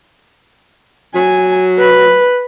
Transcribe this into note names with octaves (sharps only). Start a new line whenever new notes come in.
F#3 G#5
B4